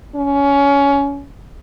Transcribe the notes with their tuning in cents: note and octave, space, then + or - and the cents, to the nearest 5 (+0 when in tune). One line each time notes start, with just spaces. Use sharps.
C#4 +20